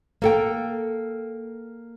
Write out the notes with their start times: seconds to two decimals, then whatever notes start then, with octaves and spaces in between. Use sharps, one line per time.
0.22 A#3 A4 G5